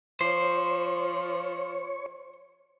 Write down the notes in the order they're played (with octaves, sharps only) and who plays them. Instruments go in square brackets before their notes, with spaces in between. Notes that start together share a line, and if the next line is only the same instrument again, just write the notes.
[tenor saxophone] F3 [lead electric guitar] C5 [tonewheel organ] C#5